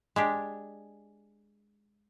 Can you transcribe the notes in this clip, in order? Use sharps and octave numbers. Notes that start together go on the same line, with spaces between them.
G#3 D4 G4